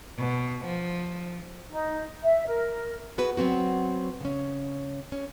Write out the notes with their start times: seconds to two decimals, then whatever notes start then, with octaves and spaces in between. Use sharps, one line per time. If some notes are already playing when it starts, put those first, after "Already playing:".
0.18 B2
0.65 F3
1.71 D#4
2.21 E5
2.47 A#4
3.18 B3 F#4 G#4 B4
3.37 F#3 B3 C4 F#4
4.21 C#3 C#4
5.12 C#4